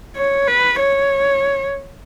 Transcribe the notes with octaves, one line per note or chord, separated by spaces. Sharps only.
C#5
B4
C#5